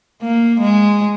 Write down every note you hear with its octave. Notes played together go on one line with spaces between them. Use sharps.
A#3
G#3